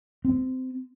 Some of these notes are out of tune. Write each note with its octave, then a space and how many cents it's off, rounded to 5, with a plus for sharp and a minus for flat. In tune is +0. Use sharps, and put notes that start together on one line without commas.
C4 -20